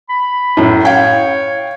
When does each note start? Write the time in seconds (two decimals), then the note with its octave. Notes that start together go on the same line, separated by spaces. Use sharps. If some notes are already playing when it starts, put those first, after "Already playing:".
0.09 B5
0.57 F#2 A2
0.85 C#5 F5 G5